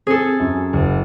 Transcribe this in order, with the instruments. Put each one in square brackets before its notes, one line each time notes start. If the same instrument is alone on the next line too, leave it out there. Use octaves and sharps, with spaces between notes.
[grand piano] C4 [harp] G#4 A4
[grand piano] F#2
F#1